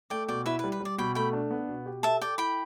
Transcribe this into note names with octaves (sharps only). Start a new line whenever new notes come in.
A3 D5 G5
B2 D5 G5
E4 B4 E5
B4
G3
B4
G3 D5
B2 G5 B5
A3 G5 B5
D4
B3
B2
G4
A4 E5 A5
A4 D5 G5
E4 G5 B5